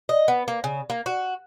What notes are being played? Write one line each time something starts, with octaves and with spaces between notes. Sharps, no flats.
D#5
B3
A#3
C#3
A#3
F#4